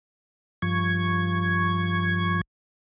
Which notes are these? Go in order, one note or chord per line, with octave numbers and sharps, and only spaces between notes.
G2 F3 C#6 G#6